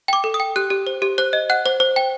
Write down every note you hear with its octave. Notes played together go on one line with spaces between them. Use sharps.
G5 D6
A4
D#6
G5
G4 F#6
G4
C5
G4
C5 F#6
D#5
F#5 F#6
C5
C5
G5